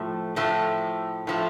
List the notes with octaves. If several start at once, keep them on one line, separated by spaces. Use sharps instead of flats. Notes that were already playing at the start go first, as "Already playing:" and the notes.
Already playing: A2 F3 A3
A2 F3 A3
A2 F3 A3